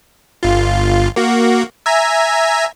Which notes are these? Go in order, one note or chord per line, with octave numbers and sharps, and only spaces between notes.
G1 F4
A#3 F#4
E5 G#5 A#5